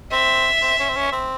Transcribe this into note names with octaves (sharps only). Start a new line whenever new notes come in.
C4 E5
C4
C#4
C4
C#4
C4